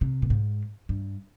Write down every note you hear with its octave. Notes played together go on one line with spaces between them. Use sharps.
C3
A#2
G#2
G2